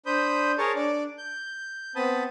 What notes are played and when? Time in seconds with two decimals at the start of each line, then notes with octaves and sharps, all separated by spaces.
0.06 D4 C5 B5 D#6 G6
0.58 G#4 A#4 C#5 A5
0.76 D4 D5
1.18 G6
1.96 B3 C4 A5 B5 D#6